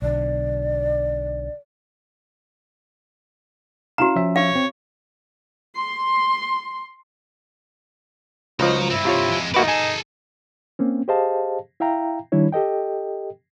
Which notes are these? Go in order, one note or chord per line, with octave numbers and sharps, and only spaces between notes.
B1 D3 D5
C#4 E4 F#4 F5 A#5
F3 C#4 E5
C#5 F5
C4
C6
C#2 F3 D#4 F#4 A#5
G2 C4 E4
C3 F4 C#5
F2 G#3
A#3 D#4 E4 F#4 B4 D5
G#4 A4 G#5
A#3 C4 C#4
G4 G#4 C5 D#5 F5 A5
E4 E5 F5 G5 A#5
D#3 G3 D4 E4 C#5
G4 A4 D#5 G5